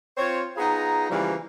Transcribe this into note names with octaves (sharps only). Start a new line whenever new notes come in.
C4 F4 C5 C#5
B3 D#4 F4 G#4 A#5
C#3 E3 F3 G3 A3 A#3